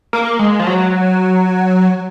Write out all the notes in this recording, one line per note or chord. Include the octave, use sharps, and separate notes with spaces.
A#3
G#3
F3
F#3